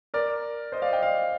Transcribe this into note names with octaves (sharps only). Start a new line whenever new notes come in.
A#4 D5
C5 D#5
D5 F5
D#5 G5
D5 F5